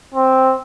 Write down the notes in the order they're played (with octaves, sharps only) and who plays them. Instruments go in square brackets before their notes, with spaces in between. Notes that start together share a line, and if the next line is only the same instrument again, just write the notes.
[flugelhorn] C4